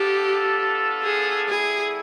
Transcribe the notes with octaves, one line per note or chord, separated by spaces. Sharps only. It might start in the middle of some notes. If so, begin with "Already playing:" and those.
Already playing: B3 D4 F4 G4 A4
G#4
G3 B3 E4 G#4 A4